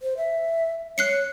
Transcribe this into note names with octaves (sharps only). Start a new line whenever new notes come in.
C5
E5
C#5 F#6 C7 C#7